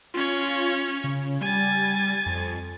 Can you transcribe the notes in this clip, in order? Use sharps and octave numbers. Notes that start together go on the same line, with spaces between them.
C#4 F4 C#5
C#3
G3 G#5 A6
F2